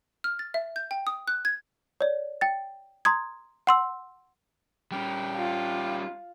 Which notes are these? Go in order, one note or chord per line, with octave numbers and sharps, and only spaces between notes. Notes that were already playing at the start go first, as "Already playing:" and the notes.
F6
A6
E5
G6
G5
D#6
F#6
G#6
C#5 D5
G5 A6
A#5 C6 D#6 G#6
F#5 C6 E6
G3 C#4 G5
F4